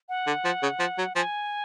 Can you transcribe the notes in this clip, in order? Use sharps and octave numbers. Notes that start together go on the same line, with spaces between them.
F#5
D3
F3
C#3
F3
F#3
F3 G#5